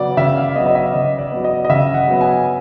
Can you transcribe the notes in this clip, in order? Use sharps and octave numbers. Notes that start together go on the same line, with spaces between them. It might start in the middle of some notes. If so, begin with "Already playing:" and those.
Already playing: C#3 F#3 B3 D5
C#3 E5
F5
F#3 B3 D#5
D#5
E5
C#3 D#5
D5
F#3 B3
D#5
D#5
C#3 E5
F#5
F#3 B3
G#5